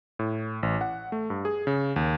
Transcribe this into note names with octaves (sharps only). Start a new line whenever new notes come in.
A2
A1
F#5
A3
G2
G#4
C#3
D#2